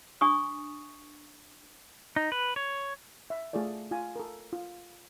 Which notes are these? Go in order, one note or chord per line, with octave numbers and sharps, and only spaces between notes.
D4 G#5 C#6 D#6
D#4
B4
C#5
E5
A3 F4 G#4 A4 D5
F4 G#5
A4 A#4
F4